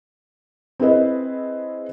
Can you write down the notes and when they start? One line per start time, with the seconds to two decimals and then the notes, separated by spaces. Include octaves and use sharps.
0.80 C4 E4 G#4 B4 D#5